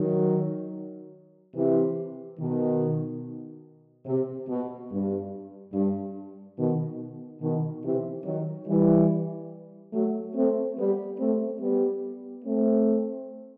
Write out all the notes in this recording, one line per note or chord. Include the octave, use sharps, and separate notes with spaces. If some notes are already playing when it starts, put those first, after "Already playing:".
Already playing: D#3 F#3
C3 E3
B2 D#3
C3
B2
G2
G2
B2 D#3
B2 D#3
C3 E3
D#3 F#3
E3 G3
F#3 A3
A3 C4
G3 B3
A3 C4
G3 B3
A3 C4